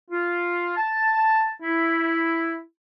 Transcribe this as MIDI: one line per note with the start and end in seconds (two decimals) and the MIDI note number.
0.11 0.73 65
0.77 1.51 81
1.63 2.59 64